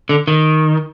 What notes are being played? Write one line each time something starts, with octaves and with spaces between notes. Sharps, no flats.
D3
D#3